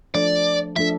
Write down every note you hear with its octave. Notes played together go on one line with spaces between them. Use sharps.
F3 A3 D4 A4 D5
F3 A3 D4 A4 E5